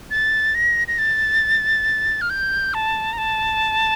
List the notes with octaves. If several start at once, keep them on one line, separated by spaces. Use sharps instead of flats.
A6
A#6
A#6
A6
F6
G6
A5
A#5
A5